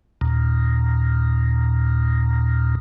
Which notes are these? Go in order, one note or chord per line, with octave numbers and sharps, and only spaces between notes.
D#2 A#2